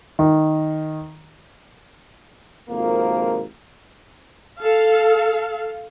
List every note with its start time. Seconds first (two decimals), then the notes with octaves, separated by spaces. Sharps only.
0.19 D#3
2.70 G#1 F2 C3 F3 A#3 A#4
4.61 A4 F5